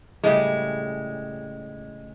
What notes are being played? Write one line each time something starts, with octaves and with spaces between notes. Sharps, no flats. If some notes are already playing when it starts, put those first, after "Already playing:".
A2 C#3 G3 G#3